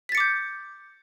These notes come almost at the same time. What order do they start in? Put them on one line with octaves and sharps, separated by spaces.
B6 A6 C#7 D6 G6